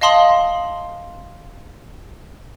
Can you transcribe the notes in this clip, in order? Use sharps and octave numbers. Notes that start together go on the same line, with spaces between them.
D#5 F5 A5 C6 D#6 F#7